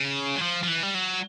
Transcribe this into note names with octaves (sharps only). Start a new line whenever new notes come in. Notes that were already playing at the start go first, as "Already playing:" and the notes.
Already playing: C#3
F#3
F3
F3
E3
G3
F#3